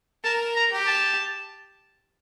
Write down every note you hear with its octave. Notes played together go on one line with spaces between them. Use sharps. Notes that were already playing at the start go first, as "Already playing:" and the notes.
A#4 A5
A#5
G4
A5